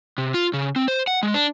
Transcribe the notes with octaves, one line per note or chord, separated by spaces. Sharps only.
C3
F4
C#3
C4
C5
F#5
G#3
D4